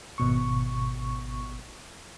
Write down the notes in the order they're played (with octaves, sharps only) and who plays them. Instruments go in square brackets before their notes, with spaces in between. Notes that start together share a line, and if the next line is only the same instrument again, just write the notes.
[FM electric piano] G#1 B2 C#6